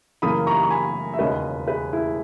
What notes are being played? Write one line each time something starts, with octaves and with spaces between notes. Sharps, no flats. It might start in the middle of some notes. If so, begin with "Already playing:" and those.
F#2 C#3 E3 A#3 B5 D#6
A#5 C#6
C#6
G#5 B5
E5
E1 D#2 C#3 B4 D#5
G#4 B4
E4 G#4